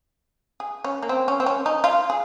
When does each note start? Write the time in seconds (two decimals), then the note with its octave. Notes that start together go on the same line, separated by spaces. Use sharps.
0.60 G#4
0.84 C#4
1.03 A#3
1.09 C4
1.28 C#4
1.40 C4
1.46 C#4
1.66 D#4
1.84 F4
2.10 G#4